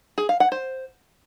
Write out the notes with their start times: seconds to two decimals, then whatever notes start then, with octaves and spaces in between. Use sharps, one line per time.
0.18 G#4
0.29 F5
0.40 F#5
0.52 C5